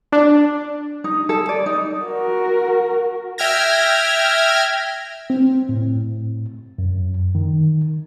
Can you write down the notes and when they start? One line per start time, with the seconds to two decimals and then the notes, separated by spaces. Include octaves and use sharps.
0.12 D4
1.04 D#4
1.29 A4
1.49 D5
1.66 D#4
2.05 F#4 A#4
3.38 E5 G5 F6 G#6 A#6
5.30 C4
5.69 A2
6.78 F#2
7.35 D#3